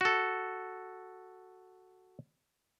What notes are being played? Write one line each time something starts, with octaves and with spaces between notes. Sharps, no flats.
F#4 A4